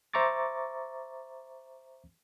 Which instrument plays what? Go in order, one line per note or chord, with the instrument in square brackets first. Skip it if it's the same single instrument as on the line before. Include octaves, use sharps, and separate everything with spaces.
[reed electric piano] C5 E5 A#5 C#6 D6 A6